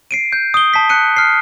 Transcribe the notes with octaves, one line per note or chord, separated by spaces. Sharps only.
C7 D7 D#7
G6
D#6 G7
A5 B6
F#6 C#7 D#7
F6 C7